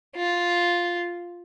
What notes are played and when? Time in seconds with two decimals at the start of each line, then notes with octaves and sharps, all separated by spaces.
0.16 F4